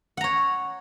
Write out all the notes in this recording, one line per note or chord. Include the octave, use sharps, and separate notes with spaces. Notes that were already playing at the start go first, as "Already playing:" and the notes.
C#5 F#5 A#5